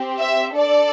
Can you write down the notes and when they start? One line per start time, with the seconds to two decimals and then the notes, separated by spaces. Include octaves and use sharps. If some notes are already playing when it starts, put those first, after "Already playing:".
Already playing: C4 G4
0.19 E5
0.57 D4 A4 D5